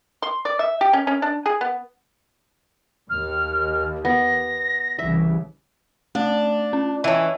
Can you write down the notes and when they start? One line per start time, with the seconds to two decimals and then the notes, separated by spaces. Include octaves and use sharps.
0.22 C6
0.45 D5
0.59 E5
0.81 G4
0.93 C#4
1.07 C#4
1.22 D4
1.46 G#4
1.61 B3
3.10 D#2 F6
4.05 B3 A#6
4.99 C2 C#3 E3 E5
6.15 A3 D4
6.73 C#4
7.04 E3 C#4 D#5 A5